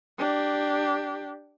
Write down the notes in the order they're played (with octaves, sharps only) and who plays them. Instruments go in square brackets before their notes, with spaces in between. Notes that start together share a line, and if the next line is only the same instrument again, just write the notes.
[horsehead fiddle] D4 G4